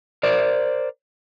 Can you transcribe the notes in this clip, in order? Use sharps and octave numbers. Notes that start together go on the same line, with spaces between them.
A#4 C5 D5